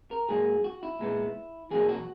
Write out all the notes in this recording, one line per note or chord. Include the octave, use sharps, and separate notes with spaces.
A#4
G#2 F#3 A#3 G#4
F#4
E4
A#2 G#3 B3
E2 B2 F#3 A#3 G#4
F#4